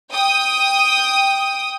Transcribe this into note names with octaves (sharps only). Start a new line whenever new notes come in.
G5 D#6